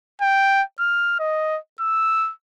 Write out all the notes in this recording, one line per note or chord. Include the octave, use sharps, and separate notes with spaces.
G5
F6
D#5
E6